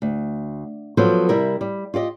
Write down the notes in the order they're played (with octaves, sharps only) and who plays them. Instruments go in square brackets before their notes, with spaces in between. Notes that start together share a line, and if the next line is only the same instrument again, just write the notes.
[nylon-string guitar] D2
F3 F#3 B3 A4 C5
C3 G3 E4 A#4
G3
F4 G4 D5 D#5